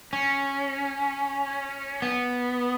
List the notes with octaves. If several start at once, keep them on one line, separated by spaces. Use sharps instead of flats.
C#4
B3